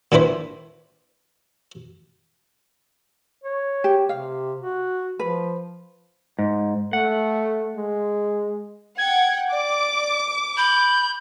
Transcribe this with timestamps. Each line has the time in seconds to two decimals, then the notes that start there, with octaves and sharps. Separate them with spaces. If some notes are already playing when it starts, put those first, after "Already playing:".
0.12 A#2 D#3 D4 E4 B4 C5
3.44 C#5
3.84 G4
4.09 C3 F5
4.60 F#4
5.19 F3 B4
6.39 G#2
6.93 A3 F#5
7.77 G#3
8.98 F#5 G5 G#6
9.52 D5 D6
10.57 B5 G6